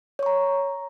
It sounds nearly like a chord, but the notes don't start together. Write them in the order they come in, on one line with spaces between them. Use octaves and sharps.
C#5 C#6 A#5